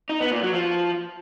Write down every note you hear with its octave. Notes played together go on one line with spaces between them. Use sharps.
D#4
B3
A#2
F#3
F3